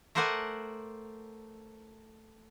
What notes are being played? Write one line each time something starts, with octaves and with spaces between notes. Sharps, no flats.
A3 A#4 C5 D5 F#5 G#5